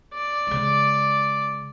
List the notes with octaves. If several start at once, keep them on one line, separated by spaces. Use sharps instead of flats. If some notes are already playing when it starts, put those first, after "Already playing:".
D5
C#3 G#3